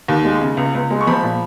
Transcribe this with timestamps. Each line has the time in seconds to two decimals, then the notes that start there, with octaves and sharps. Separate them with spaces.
0.08 D#2
0.25 G#3
0.41 C#3
0.57 C#2
0.75 C#2
0.91 G#3
1.01 C#6
1.07 F3 B5
1.23 A#2